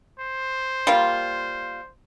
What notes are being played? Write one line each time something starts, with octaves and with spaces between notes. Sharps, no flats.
C5
G3 A#3 F4